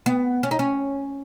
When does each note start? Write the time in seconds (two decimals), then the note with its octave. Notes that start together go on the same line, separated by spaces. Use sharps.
0.06 B3
0.43 C#4
0.51 D#4
0.59 C#4